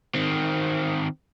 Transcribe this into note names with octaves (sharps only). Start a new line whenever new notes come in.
D#3 C4